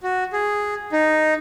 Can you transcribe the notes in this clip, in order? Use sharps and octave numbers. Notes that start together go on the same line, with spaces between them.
F#4
G#4
D#4